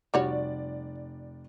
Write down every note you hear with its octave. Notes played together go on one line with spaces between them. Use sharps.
F1 G3 F#4 C#5 D5